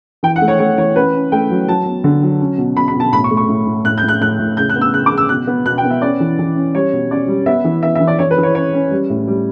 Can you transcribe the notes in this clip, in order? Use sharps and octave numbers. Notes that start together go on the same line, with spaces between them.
E3 G5
F#5
A3
C#5
A3 C#5
E3 C#5
C#4 B4
C#4
A3 G5
F#3
F#3 A5
B3
D3
F#3
C#4
B2
B2 B5
B5
B2
A5
A2 B5
C#6
A3
C#6
A2
A2
A2 F#6
G6
A2
F#6
A2 F#6
A2
C#3 G6
F#6
B3
E6
C#3 F#6
D6
C#3
E6
B2 F#6
B3
B2 F#6
G5
B3
E5
C#4 D5
E3
E3
C#4
G3 C#5
B2
C#4 D5
G3
B3 E5
E3
B3 E5
E5
E3
D5
E3 C#5
B4
E3
C#5
C#4 C#5
C#4
G3
A2
G3